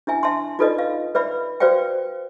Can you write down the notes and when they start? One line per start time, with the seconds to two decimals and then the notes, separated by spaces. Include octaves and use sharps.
0.07 D4 E4 E5 G#5
0.23 E5 A5 C6
0.59 D#4 F4 A4 B4 D5 D#5
0.79 F5
1.15 B4 D5 E5 B5
1.60 F#4 B4 C5 D5 F5 G5